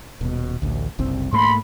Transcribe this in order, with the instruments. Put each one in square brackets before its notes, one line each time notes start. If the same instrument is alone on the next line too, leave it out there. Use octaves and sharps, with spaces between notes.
[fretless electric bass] D#1 B2
A1 D2
F#1 C2 C4
[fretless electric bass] G#2 A3 A#3 [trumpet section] B5 C6